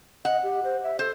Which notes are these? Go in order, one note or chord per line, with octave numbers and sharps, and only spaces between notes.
D#5 F#5
G4
C5
E5
A4 C5